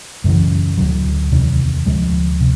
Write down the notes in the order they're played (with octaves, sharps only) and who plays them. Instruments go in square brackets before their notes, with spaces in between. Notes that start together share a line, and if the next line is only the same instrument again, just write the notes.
[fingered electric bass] F#2 C#3 E3
D2 D3 F#3
E2 C3 D#3
D2 D3 F3 G#3
C3